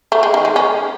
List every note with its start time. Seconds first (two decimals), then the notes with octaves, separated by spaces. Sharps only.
0.12 A3
0.23 G#3
0.34 D#3
0.45 G#3
0.56 C#4